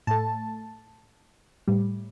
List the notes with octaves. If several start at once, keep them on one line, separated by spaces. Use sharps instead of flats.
A2 A3 A5
A2 G3